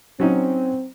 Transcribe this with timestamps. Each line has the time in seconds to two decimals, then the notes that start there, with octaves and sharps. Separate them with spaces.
0.20 F#3 C4 C#4 D#4